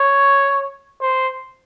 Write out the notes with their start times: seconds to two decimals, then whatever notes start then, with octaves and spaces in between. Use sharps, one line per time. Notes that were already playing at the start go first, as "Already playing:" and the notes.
Already playing: C#5
1.01 C5